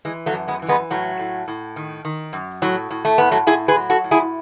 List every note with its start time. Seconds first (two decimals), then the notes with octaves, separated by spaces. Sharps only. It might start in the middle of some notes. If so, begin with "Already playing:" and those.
0.05 E3 G#3
0.26 F#3 A3
0.34 F#2
0.48 G#3 B3
0.62 E3
0.69 G#3 B3
0.90 A2 F#3 A3
1.19 A2
1.48 A2
1.76 D#3
2.05 D#3
2.33 F#2
2.62 A2 F#3
2.91 A2
3.05 A3
3.18 A2 B3
3.31 F#3 A3
3.47 A2 E4 G#4
3.68 G#4 B4
3.76 F#3
3.90 F#4 A4
4.04 A2
4.11 E4 G#4